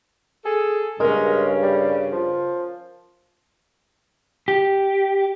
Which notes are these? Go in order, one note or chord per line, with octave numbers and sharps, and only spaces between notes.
G#4 A4
G2 C#3 G#3 C#4 A#4
G3
F3
G4